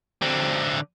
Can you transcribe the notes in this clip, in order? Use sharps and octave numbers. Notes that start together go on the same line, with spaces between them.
D3 C4